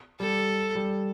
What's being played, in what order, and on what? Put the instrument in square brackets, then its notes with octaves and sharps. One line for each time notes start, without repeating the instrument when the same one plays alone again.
[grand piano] G3 [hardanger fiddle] A4
[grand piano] G3